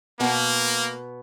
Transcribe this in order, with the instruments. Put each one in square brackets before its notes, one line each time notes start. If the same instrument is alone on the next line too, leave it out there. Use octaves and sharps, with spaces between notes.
[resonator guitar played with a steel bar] B2 B3 [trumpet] A#3